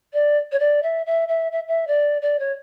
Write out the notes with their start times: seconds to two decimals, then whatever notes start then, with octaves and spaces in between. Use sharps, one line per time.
0.13 D5
0.52 C#5
0.60 D5
0.83 E5
1.06 E5
1.28 E5
1.52 E5
1.68 E5
1.87 D5
2.22 D5
2.39 C#5